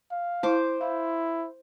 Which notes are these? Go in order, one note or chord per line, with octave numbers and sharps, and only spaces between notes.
F5
E4 C5 A5 D6
E4 F5